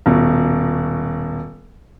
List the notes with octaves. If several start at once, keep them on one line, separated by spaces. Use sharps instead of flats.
D#1 B2